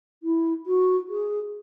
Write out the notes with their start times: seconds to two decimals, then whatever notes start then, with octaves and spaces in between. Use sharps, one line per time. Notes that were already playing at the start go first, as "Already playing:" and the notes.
0.23 E4
0.66 F#4
1.09 G#4